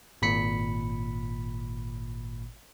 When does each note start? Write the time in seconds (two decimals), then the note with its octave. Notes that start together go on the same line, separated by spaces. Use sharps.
0.22 G#1 A#2 B5 B6 C#7